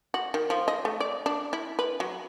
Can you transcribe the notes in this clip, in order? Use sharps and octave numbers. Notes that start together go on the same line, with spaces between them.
F#4
D#3
F3
D#5
A3
D5
D4
E4
B4
F#3